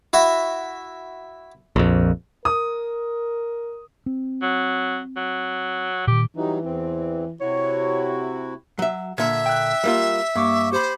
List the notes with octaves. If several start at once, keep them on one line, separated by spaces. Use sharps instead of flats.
E4 F#4 E5
A#1 F2
A#4 D#6
C4
F#3
F#3
A#2 D#3 G4
E3 F#3 G3 D#4
E2 C4
C3 E4 F#4 C#5
F#3 E5
A#2 D3 E5 G#6
G5 F#6
G3 A#3 F4
G2 A#3 C#6 D6
G4 C5 B5